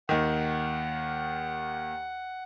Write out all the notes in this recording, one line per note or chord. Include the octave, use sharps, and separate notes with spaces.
D#2 D#3 F#5